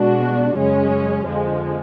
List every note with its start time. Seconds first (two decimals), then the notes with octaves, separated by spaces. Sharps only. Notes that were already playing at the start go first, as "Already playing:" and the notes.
Already playing: B2 G#3 D4 F#4
0.58 F#2 C#3 G#3 C#4
1.27 F2 D3 F3 G#3